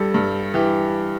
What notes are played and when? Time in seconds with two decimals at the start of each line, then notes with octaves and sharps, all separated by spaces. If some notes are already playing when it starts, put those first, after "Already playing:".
Already playing: G2 G3 A4
0.14 G2
0.54 E3 G4